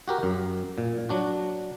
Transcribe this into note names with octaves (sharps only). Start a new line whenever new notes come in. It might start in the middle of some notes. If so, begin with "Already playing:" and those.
F#4 G4 A#4
F#2
A#2
F#3 D4 F#4